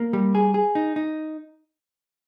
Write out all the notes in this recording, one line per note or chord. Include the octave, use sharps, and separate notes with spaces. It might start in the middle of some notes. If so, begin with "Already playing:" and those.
Already playing: A#3
G3
G#4
G#4
D#4
D#4